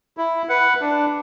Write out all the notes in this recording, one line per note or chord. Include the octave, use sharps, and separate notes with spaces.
E4
B4 F#5
D4